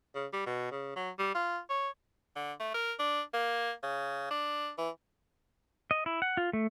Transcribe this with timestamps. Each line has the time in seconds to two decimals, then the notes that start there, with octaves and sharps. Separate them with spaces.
0.15 C#3
0.33 G3
0.46 B2
0.71 C#3
0.96 F#3
1.19 G3
1.35 F4
1.70 C#5
2.36 D3
2.60 A3
2.74 A#4
2.99 D4
3.34 A#3
3.83 C#3
4.30 D4
4.78 E3
5.91 D#5
6.06 E4
6.22 F#5
6.37 F4
6.53 A3